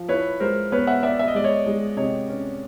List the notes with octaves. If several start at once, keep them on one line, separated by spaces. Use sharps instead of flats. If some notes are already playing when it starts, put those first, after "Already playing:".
Already playing: F3
E4 B4 C#5
G#3 A#4 C5
B3 B4 C#5
E5 F#5
B3 D5 E5
E5
D#5
G#3 D5
C#5 D#5
G#3
C3 C#5 D#5
C#4